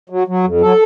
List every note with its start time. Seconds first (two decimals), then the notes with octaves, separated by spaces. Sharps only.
0.09 F#3
0.27 F#3
0.44 F2
0.61 F#3 A4